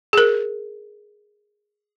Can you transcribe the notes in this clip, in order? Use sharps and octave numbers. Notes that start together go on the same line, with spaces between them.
G#4 A#4